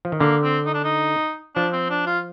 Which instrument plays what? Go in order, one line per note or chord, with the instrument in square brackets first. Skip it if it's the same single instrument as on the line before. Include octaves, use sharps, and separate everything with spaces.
[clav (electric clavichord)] F3
D#3
[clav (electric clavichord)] D3 [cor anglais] A#3
[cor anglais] C4
D#4
D4
D#4
[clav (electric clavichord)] F3 [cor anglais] D4
[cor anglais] C4
D4
F4